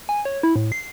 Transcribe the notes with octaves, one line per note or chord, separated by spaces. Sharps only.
G#5
C#5
E4
A2
C7